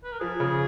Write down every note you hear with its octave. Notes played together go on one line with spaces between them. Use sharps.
B4
A#4
F3 G#4
C#3